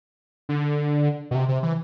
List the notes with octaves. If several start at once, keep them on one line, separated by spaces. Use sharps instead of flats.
D3
B2
C3
C3
E3